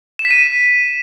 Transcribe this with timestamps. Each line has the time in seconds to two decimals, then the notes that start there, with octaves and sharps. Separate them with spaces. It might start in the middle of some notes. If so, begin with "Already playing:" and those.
0.19 E7
0.25 B6
0.31 D#7